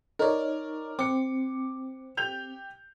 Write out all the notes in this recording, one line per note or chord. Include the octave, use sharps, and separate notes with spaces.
D#4 A#4 C#5 D5
C4 D6 C#7
G4 G6 F7